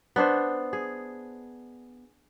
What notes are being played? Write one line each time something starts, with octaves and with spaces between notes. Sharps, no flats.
B3 D4 C5
G#4